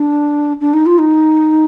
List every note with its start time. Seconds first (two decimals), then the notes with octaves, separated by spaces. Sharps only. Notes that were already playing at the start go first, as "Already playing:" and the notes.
Already playing: D4
0.61 D4
0.73 D#4
0.86 F4
0.99 D#4